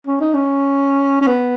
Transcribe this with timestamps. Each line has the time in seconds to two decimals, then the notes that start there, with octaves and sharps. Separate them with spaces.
0.07 C#4
0.21 D#4
0.34 C#4
1.21 C#4
1.27 B3